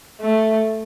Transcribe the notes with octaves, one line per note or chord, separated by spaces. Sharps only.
A3